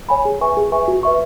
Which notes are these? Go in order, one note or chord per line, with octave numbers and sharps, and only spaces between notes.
C#5 G#5 B5
G#4
B4 E5 G#5 C#6
G#4
B4 E5 G#5 C#6
F#4
B4 E5 C#6